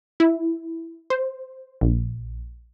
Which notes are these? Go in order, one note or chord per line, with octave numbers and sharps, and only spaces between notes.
E4
C5
A#1